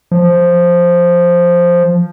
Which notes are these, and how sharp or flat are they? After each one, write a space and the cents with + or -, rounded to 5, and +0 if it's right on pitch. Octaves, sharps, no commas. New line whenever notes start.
F3 +0